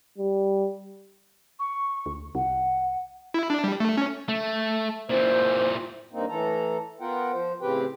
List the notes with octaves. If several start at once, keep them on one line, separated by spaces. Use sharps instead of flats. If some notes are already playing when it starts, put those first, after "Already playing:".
G3
C#6
D2
C2 F#5
E4
D4
G3
A3
C#4
A3
A#2 E3 C5
G2 A#3 C4 D#4
A2 E3 A4 A#5
B3 F4 A#4 F#5 G5
F3 C5
A2 C#3 C4 G4 B4 G5